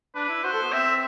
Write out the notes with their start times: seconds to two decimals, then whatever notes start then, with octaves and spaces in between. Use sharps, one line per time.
0.15 D4 B4
0.29 E4
0.44 F#4 C5
0.53 A4
0.63 B3
0.72 C4 E5
0.86 C4